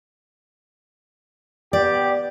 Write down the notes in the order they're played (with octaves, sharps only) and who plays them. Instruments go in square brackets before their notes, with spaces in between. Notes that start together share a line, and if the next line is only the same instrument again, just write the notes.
[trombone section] B3 G4 [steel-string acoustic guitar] D5